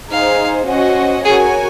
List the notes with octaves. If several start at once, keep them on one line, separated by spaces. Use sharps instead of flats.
D#4 G#4 C5 F5
C#4 F#4 C5 D#5 F#5
F#4 G#4 A#4 C#5 G#5